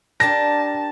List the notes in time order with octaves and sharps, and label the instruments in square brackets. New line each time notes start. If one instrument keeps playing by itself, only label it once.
[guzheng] D4 G4 A#4 [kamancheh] A5 [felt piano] A#6